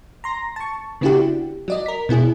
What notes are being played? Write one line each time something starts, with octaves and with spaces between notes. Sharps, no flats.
A#5 C6 A#6
A5 C#6
C#3 B3 D4 E4 F#4 G4
F#3 D5 D#5
A#4 B6
B2 B3 E4 G#4